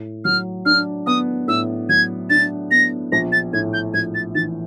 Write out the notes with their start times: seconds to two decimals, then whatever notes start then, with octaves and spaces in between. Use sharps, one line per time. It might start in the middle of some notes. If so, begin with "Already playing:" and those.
Already playing: A2
0.25 F#3 F6
0.65 D4 F6
1.06 B3 D#6
1.48 A2 E6
1.89 F#3 G#6
2.30 D4 A6
2.71 B3 A#6
3.12 A#1 A#6
3.32 A6
3.53 A2 G#6
3.73 G6
3.94 A#1 G#6
4.15 A6
4.35 E3 A6